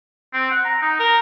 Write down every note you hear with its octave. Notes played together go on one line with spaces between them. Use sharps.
C4
F#5
A#5
D#4
A#4